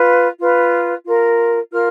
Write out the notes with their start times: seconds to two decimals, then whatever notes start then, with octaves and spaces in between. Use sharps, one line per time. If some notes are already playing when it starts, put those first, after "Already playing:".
Already playing: F4 B4
0.39 F4 B4
1.05 F4 A#4
1.70 F4 A#4 F6